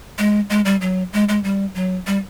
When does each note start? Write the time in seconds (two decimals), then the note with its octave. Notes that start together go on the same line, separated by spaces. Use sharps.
0.19 G#3
0.50 G#3
0.65 G3
0.81 F#3
1.13 G#3
1.29 G#3
1.44 G3
1.75 F#3
2.07 G3